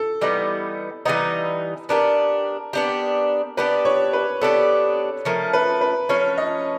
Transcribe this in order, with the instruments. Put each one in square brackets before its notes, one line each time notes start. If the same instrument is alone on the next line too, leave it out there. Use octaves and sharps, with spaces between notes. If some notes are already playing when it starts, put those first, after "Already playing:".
Already playing: [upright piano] A4
[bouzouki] E3 G3 B3 D#4
E3 G3 B3 D#4
[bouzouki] B3 D4 G4 [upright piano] A#4
[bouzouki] B3 D4 G4
[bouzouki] B3 D4 G4 [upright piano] B4
[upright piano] C#5
B4
[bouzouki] B3 D4 G4 [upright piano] A4
[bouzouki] F3 A3 C#4 [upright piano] A#4
[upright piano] B4
B4
[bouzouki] F3 A3 C#4 [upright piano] C#5
[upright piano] D#5